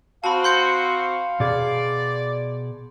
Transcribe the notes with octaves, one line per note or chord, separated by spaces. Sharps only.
C4 F#4 F5 A5 B5
C6 G6 C#7
B2 G#4 D5